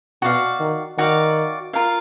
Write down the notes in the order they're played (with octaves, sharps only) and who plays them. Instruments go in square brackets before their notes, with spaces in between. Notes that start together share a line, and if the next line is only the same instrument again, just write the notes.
[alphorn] B2 [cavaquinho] F#4 D5 F5
[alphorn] D#3
[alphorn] D#3 [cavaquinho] F#4 D5 F5
[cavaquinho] F4 A#4 F5